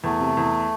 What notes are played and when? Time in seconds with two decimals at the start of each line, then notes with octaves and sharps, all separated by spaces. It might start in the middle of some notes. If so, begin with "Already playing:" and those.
0.04 E2 A3
0.20 C3
0.37 E2